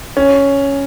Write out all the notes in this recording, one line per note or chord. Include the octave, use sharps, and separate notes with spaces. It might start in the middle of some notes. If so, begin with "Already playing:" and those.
C#4